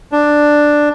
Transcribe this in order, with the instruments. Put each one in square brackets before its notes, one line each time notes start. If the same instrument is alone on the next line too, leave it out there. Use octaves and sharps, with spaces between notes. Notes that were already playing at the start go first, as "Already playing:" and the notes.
[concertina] D4